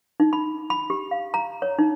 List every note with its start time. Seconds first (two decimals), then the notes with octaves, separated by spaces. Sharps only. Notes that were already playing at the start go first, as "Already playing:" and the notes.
0.20 D#4
0.33 B5
0.70 B5
0.90 G4
1.11 F5
1.34 A#5
1.62 C#5
1.79 D#4